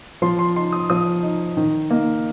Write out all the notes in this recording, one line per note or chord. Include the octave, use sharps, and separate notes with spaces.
F3 C6
C6
D#4 C6
D#6
F3 D#6
D#4
D#3
A#3 D#4